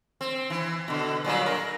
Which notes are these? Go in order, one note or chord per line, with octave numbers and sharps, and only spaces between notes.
C4
E3
B2 D3
A#2 F#3 G3
A#4